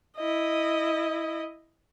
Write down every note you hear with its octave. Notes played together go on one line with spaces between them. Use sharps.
E4 D#5